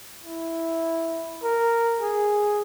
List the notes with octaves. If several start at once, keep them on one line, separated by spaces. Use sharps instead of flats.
E4
A#4
G#4